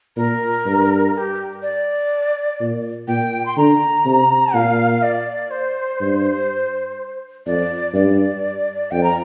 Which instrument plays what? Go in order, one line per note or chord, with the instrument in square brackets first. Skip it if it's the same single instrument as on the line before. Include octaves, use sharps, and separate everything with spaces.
[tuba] A#2 [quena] A#4
[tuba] G2
[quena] A#4
G4
D5
[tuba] A#2
[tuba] A#2 [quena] G5
[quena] C6
[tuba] D3 [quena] A#5
[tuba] C3
[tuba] A#2 [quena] F5
[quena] D5
C5
[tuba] G2
[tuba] F2 [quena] D5
[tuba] G2 [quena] D5
[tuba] F2 [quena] G5
[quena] A#5